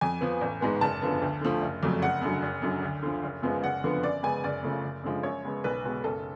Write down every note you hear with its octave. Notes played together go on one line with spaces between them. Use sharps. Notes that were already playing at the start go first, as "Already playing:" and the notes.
F2 G#5
F3 B3
A1
G#2 G#3 B3
F#1 A5
F#2 D3 F3 B3
D2
D3 F3 A3
F#1
F2 C#3 F#3 A3
F#1 F#5
F#2 D3 F#3
F#1
F#2 D3 F#3
D2
D3 F3
F#1
F#2 F3 G#3 B3
F#1 F#5
F2 D3 F3 B3
F#2 D5
C#3 G#3 B3 G#5
F#1 D5
F#2 C#3 F3 A3
F#1
F#2 D3 F3 G#3
F#2 C#5
C#3 G#3 B3
B1 B4
B2 G#3 B3
F#1 A4